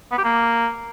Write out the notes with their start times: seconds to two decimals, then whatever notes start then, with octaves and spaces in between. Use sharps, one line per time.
0.12 B3
0.18 G4
0.24 A#3